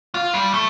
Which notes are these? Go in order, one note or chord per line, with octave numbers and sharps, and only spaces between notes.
F4
G3
A3